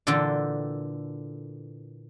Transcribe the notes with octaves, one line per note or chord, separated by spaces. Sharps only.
A#2 D3 E3 A4 G5